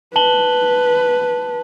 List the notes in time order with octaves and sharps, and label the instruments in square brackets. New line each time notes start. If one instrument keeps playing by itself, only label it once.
[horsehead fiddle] B4 [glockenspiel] A5 F#7 G7